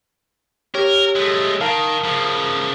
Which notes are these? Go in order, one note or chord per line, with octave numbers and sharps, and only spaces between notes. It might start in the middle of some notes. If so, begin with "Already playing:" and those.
G4 A#4 C#5
G#3 A3
D#3 A#4 F5 A5
C#3 F3